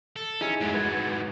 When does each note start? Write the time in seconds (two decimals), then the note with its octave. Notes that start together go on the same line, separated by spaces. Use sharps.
0.16 A4
0.41 C#4 D#4 E4 G#4
0.60 F2 G#2 F#3 G#3 E4
0.74 B4 G#6 A6